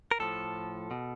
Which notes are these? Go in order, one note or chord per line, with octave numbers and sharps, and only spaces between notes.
A#4
A2 F3 A4
B2